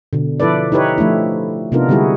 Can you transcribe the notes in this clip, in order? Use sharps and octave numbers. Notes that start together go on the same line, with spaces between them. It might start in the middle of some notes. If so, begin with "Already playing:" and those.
B2 D3
F3 E4 A4 B4 D5
D#4 E4 G4 B4 C#5
F3 A3 D4 E4
C3 B3 D4 D#4 F4 A#4
D3 G3 G#3 E4 F#4 G#4